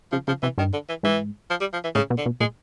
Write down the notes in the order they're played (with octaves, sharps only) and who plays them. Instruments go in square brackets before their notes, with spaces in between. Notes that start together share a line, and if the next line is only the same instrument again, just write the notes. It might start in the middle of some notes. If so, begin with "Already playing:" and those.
[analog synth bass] C#3 [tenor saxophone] F3
[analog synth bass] C#3 [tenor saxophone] F3
[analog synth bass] C3 [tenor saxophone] E3
[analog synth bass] G2 [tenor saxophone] D#3
[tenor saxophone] D3
E3
[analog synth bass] G#2 [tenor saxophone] E3
[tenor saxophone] F3
G3
F3
E3
[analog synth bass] A2 [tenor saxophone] C#3
[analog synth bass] B2
[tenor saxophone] D3
[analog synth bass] B2
[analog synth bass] A#2 [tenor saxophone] G#3